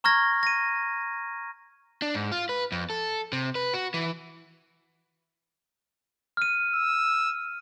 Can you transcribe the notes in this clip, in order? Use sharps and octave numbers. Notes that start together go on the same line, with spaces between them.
A#5 C#6 F6 G#6 A#6
A#6 D#7
D4
G#2
F4
B4
F2
A4
C3
B4
F#4
E3
F6 D#7
E6